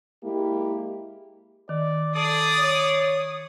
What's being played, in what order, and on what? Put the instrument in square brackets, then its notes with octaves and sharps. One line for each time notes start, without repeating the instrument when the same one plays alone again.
[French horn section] G#3 A#3 E4 G4
[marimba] D#3 [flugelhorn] D5
[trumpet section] G#4 D5 [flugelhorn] A4 [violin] D#6
[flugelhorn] C#5